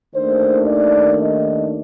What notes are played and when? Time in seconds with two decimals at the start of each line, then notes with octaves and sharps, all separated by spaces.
0.15 D#2 D#3 A3 D4 C5
0.68 D5
1.21 D#5